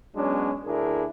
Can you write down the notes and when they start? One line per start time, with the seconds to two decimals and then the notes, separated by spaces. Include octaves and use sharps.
0.16 F#3 G#3 B3 C#4 D4
0.65 D2 D4 E4 G#4 A#4